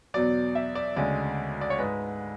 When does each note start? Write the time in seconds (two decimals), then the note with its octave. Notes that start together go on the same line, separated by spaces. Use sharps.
0.14 E2 B2 F#3 D5
0.55 E5
0.75 D5
0.96 D2 C#3 G#3 D5
1.61 D5
1.70 C#5
1.78 G#2 G#3 B4